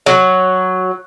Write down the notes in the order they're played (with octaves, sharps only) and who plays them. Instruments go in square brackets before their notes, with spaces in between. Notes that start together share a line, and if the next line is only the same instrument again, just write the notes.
[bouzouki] F#3